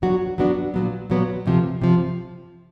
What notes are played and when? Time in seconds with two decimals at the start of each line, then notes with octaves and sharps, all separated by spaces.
0.02 F#3 B3 D4 F#4
0.38 F#3 B3 D4 F#4
0.74 A#2 F#3 B3
1.10 A#2 F#3 B3
1.46 D2 C3 F3
1.82 C3 F3